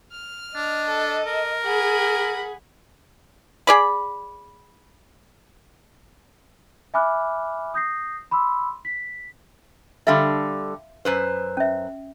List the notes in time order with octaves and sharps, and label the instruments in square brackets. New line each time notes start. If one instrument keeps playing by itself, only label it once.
[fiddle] F6
[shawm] D4 [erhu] D#5
[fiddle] A4
[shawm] A#4
[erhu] G#4 [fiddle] F#5 B5
[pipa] G#4 D5 B5
[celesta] E5 G#5 B5 D6 F6 F#6
D#6 G6 A#6 C7
B5 C6 D6 E6
B6
[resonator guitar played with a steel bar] D3 G3 A4 [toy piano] E5 F5 C6
[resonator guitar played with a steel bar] F#2 B4 C5
[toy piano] C#4 E5